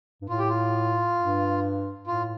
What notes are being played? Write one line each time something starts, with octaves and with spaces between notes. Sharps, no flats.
G2
A2 F4
G4
F4
G2
A2 F4